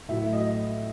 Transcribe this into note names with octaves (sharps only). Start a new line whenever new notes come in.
A2 F#3 E5
D#5